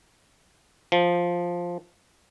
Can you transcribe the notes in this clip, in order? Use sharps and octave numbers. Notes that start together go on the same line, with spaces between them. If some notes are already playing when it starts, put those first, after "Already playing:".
F3